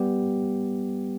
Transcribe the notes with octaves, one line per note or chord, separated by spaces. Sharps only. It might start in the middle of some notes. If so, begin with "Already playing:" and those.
Already playing: G3 B3 G4